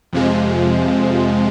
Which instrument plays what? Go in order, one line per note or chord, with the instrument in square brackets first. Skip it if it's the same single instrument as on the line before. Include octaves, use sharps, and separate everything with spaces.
[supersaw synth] F2 C3 F3 G#3